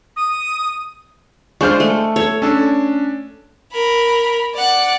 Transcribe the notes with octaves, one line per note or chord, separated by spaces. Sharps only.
D#6
G#3 D4 F4 C5 C#6 F6
A3
A4 C#5
C#4 D4 A4
A#4 B5
D5 F#5